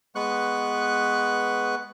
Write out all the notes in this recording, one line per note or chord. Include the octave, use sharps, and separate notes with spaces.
G#3 B3 B4 C#6 F#6